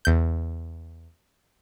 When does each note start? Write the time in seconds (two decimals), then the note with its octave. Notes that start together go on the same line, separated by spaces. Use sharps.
0.05 E2 G6